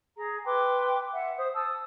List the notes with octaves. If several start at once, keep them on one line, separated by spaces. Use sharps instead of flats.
G#4 A#5
B4 G5 C6 D6
E5 F#5
C5 D#6
A5 D#6 E6